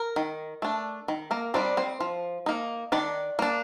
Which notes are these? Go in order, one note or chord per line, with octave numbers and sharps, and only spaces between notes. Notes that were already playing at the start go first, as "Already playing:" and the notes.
Already playing: A#4
D#3
A3 D4
D#3
A#3 A#4
G3 C4 D4 D#4 D5
C4 C5
F3
A#3 D#4
D#3 D4 D5
A#3 D4